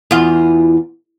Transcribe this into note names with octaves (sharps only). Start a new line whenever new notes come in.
E2 F4